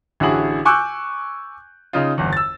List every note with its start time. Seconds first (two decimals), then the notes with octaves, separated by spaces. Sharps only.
0.20 A1 D3 E4 F#4 G#4 F#7
0.65 G#5 C#6 D6 E6 F#6 G6
1.93 C#3 D#4 F4
2.18 G1 E2
2.33 E6 A6